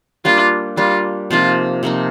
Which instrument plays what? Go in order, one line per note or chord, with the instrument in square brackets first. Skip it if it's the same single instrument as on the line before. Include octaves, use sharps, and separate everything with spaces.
[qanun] G3 A#3 D4 G4 [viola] F4
[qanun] G3 A#3 D4 G4 [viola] F4
[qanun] C3 F3 A#3 D#4 [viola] F4
[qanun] C3 F3 A#3 D#4